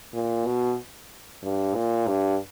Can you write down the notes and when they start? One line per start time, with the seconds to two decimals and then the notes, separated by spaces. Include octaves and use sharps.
0.14 A#2
0.46 B2
1.43 G2
1.75 A#2
2.07 G2